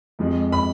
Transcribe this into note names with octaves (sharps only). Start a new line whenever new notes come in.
F2 F3 G#3
B5